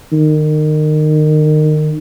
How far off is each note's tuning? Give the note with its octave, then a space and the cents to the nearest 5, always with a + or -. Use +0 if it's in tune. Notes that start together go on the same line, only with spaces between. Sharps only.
D#3 -25